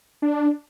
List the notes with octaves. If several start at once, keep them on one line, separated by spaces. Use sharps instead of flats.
D4